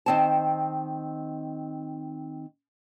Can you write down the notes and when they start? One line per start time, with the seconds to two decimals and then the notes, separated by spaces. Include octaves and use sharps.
0.06 D#3 C4 A5